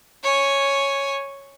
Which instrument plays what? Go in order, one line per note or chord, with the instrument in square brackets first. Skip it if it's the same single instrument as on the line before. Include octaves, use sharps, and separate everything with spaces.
[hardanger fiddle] C#5 G#5